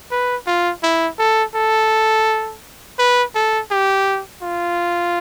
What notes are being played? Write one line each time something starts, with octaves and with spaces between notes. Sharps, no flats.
B4
F4
E4
A4
A4
B4
A4
G4
F4